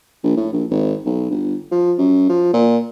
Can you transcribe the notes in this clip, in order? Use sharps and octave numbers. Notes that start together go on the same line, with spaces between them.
A#1
A2
A#1
G#1
B1
G1
F3
F#2
F3
A#2